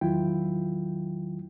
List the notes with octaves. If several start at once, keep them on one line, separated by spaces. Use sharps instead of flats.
E2 D#3 F#3 E4 F4 G5